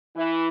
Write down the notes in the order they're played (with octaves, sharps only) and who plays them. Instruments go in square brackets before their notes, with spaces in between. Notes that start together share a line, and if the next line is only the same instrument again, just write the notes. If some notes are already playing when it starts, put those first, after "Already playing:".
[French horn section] E3 [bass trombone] E4